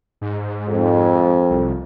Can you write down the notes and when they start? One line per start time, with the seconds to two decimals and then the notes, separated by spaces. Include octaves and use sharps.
0.21 G#2
0.67 F2
1.50 C2